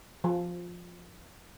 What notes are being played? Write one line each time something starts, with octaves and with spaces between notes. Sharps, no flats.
F3